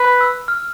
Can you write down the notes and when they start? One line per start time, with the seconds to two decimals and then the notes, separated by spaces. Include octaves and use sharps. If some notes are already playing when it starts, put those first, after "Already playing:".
Already playing: B4
0.21 E6
0.48 F6